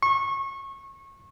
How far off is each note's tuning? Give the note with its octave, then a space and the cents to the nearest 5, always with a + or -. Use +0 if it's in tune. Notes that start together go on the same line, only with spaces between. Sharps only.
C#6 -25